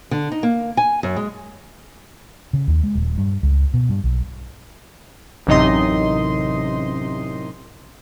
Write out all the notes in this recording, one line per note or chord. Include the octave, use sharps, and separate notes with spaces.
D3
D#4
A#3
G#5
F#2
G#3
C#3
D#2
G#3
D#1
G2
C#2
B2
G2
B1
A1 F#2 C3 D#4 D#5 C6